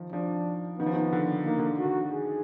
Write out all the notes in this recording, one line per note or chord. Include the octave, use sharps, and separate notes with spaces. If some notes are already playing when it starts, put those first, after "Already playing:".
Already playing: D#3 F3
F3 D4
D#3 B3
F3
D#3
D3
D#3 A#3
D3
F#4
D3
G#4